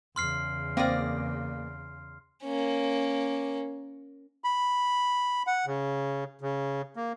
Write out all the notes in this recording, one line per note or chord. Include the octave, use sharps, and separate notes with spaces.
E2 C#3 C6 F6 C7
A#3 C4 D5 D#6 A#6
A#3 C#4
B5
F#5
C#3
C#3
A#3